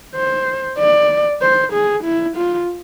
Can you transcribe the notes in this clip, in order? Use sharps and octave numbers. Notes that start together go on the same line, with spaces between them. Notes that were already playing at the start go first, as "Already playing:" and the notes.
C5
D5
C5
G#4
E4
F4